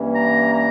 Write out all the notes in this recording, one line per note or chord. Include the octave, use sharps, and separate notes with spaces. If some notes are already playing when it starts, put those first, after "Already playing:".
Already playing: G2 E3 A#3 C#4
A#5
A#5